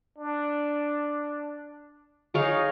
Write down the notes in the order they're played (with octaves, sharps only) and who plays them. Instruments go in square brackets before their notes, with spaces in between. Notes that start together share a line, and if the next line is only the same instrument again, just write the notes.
[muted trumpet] D4
[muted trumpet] D#4 [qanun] G#4 C#5 F5